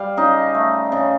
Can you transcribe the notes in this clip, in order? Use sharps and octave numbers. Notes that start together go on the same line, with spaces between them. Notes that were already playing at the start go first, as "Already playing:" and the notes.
Already playing: G3 F5
C#3 D#4 D#5
A3
C#3